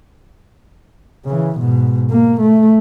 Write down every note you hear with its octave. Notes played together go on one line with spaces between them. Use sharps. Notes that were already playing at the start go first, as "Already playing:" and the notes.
C#3 E3
G#2 B2
A#3
A3